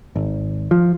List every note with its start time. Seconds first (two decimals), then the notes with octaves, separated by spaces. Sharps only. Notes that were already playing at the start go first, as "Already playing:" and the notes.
0.16 G#1
0.71 F3